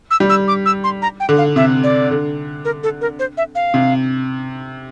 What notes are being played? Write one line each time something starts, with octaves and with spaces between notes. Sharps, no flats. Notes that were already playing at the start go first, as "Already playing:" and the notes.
E6
G3
E6
D6
E6
C6
A#5
G5
D3
F5
C3 E5
D5
D3
A#4
A4
A#4
C5
E5
F5
C3